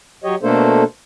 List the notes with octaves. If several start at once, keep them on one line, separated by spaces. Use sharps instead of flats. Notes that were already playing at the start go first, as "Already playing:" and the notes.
F#3 G4 C#5 D#5
B2 A3 A#3 D4 A4 C5